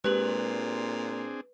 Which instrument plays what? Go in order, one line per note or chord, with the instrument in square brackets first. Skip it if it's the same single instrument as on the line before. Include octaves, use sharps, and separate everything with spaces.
[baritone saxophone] A#2 [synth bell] G#3 G4 F#7 [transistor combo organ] C4 D4 G#4 [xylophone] B4